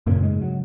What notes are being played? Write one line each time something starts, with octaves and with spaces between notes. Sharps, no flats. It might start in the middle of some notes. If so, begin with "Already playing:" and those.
F#2 A#2 C#3 A#3
G#2 G#3
F#3